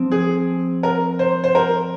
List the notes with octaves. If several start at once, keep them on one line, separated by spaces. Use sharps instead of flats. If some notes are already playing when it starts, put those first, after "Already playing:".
Already playing: F3 C4
G#4
A#4
C5
C5
A#4